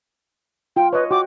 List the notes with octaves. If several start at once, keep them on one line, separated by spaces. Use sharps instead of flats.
F4 G5
B4 C#5 D#5
F#4 G5 D6